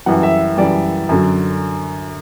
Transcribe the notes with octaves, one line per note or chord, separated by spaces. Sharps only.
F#2 E3 G3 F#5
E5
F#2 E3 G3 D5
F#2 D3 F#3